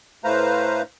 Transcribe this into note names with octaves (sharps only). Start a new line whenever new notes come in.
A2 A3 B4 C5 F5 A#5